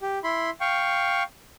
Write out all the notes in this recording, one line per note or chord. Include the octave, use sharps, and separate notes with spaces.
G4
E4 B5 C6
F5 G5 C#6